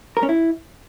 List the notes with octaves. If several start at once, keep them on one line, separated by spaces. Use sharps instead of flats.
A#4
C#4
E4